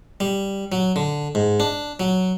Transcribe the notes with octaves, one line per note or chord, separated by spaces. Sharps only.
G3
F#3
D3
G#2
D4
F#3